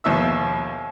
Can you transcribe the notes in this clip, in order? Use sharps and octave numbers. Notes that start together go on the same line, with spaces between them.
A#1 D#2 B2 E5 E6